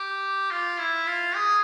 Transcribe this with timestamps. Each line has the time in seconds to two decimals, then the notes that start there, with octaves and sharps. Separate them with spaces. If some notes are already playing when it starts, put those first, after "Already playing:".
Already playing: G4
0.51 F4
0.78 E4
1.07 F4
1.35 G#4